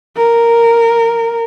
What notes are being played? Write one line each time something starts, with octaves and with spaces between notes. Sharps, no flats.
A#4